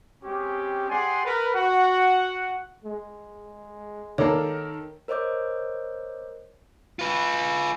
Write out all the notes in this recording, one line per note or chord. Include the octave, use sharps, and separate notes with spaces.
G#3 C4 C#4 G4
G4 G#4 D5 F#5 G#5 C6
A#4 B4
F#4 F#5
G#3
D#3 A#3 A4 A#4 C#5 D5
A#4 C5 C#5 D#5 D6 G6
F4 B4